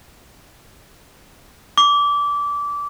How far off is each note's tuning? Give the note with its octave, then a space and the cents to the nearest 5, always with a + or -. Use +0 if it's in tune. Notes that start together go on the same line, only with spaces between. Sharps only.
D6 -20